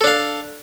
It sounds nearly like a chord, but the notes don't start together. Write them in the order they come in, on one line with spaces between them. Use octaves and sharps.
A4 D4 F5